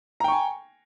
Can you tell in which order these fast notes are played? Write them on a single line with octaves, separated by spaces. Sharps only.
A#5 G5 C#6 G#5